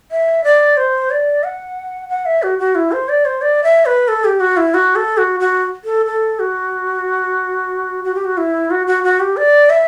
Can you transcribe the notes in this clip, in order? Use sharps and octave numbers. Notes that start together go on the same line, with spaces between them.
E5
D5
C5
D5
F#5
F#5
E5
F#4
F#4
E4
C5
D5
C5
D5
E5
B4
A4
G4
F#4
E4
F#4
A4
F#4
F#4
A4
A4
F#4
F#4
G4
F#4
E4
F#4
F#4
F#4
G4
D5
E5